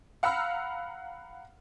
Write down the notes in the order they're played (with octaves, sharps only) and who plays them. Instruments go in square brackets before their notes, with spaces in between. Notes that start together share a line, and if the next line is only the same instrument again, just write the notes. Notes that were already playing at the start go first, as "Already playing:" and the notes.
[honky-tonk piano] F5 F#5 A#5 B5 E6 F6